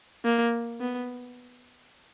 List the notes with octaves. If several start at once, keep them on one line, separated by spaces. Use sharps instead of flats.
A#3
B3